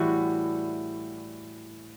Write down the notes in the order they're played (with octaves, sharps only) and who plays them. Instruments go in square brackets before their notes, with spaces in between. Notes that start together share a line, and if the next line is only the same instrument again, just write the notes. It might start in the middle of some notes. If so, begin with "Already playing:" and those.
Already playing: [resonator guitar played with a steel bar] A2 E3 G3 F#4